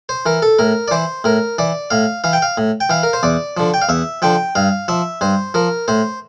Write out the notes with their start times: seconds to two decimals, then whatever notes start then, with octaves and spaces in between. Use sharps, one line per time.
0.09 C5
0.26 E3 A#4
0.42 A4
0.59 A2 A#4
0.88 D5
0.91 E3 C5
1.24 A2 A#4
1.58 E3 D5
1.91 A2 F5
2.24 E3 F5
2.33 G5
2.42 F5
2.58 A2
2.81 G5
2.90 E3 F5
3.03 A#4
3.13 C5
3.23 E2 D5
3.57 D3 F3
3.74 G5
3.82 F5
3.89 E2 E5
4.22 D3 F3 G5
4.55 G2 F5
4.88 F3 E5
5.21 G2 C5
5.54 F3 A#4
5.88 A2 C5